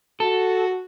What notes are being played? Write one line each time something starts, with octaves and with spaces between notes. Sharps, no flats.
F#4 A4